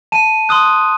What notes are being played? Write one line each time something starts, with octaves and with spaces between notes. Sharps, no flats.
A5 D#7
C6 D#6 F#6